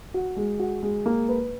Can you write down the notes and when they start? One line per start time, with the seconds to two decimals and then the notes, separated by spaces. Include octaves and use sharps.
0.14 F#4
0.37 G#3
0.59 F#4
0.83 G#3
1.06 A#3
1.29 B4